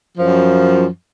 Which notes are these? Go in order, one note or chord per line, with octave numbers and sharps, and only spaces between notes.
F#2 F3